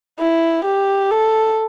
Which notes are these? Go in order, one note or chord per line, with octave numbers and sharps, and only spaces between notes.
E4
G4
A4